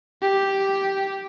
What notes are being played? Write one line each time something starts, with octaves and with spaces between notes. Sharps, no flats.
G4